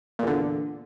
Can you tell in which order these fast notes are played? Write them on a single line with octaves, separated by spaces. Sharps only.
A#2 E2 D3